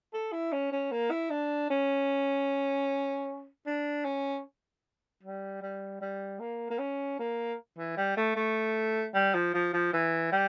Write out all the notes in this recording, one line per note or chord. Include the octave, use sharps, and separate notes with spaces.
A4
E4
C#4
C#4
A#3
E4
D4
C#4
D4
C#4
G3
G3
G3
A#3
A#3
C#4
A#3
E3
G3
A3
A3
G3
F3
F3
F3
E3
G3